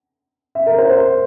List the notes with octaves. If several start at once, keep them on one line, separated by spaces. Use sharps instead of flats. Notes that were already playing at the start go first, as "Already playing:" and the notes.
E5
A#4
C5
C5